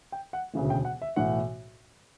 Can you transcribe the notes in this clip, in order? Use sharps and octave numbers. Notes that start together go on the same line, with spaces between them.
G5
F#5
E1 D2 C#3 E3 A3
G5
F#5
E5
B1 A2 E3 A3 F#5